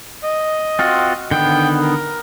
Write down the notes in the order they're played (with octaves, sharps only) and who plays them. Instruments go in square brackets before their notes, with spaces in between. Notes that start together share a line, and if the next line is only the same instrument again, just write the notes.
[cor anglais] D#5
[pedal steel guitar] C4 F4 F#4
[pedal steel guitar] D3 D#3 B3 [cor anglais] G5
[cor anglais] A#4